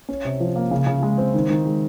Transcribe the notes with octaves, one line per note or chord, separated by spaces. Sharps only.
C#4
C3
F3
A#3
C#3
C#3
G#3
C4
D#3
D#3
G#3